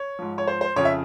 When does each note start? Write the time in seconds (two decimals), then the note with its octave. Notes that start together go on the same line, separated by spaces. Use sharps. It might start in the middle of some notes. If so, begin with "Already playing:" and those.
Already playing: C#5
0.19 G#2 F3
0.38 C#5
0.47 C5
0.61 C5
0.76 F2 C#3 F3 C#5
0.85 E5